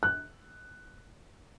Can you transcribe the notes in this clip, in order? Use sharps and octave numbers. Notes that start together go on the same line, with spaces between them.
F#6